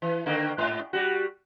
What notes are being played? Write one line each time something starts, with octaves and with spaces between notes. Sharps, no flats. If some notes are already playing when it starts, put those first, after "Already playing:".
E3
D3 D#3 A#3
G#2
G3 F#4